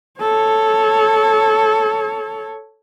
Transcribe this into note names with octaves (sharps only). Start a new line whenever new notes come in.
A4 C#5